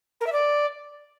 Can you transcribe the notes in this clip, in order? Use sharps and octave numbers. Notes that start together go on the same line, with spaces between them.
A#4
E5
D5